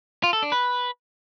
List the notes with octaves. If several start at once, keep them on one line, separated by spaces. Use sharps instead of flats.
F4
A4
D4
B4